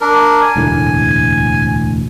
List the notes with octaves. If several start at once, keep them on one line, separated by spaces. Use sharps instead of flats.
D4 A#4
G#5
E1 D2 A2